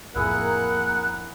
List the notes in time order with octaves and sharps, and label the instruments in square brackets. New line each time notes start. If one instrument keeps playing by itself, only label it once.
[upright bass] F2 A2 [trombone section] A#3 A#4 [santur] E4 G#4 B5 [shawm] F#5